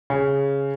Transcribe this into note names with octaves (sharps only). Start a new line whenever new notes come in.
C#3